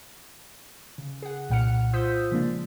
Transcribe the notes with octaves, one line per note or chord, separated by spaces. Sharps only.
C#3
G#4 F#5
C2 A#2 F#5 F6 C#7
F4 C5 D#6 E6 G6 B6
C#3 F3 G#3 A#3 D4